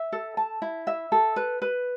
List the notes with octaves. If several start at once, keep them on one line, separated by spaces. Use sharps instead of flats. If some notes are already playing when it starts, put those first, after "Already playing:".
Already playing: E5
A4
A5
E4
E5
A4
B4
B4